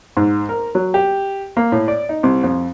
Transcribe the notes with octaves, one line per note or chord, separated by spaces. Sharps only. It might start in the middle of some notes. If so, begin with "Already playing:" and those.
G#2
A#4
F#3
G4
A#3
A2
D5
D#4
C2
F2